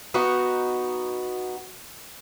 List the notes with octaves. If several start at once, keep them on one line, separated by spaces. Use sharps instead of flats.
B3 D#4 F#4